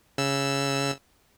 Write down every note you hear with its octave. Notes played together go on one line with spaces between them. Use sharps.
C#3 E6